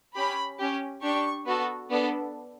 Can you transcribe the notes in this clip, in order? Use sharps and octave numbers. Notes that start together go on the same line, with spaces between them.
C#4 G4 B5
C#4 G4
D4 G4 C#6
B3 F#4 A4
B3 D4 A4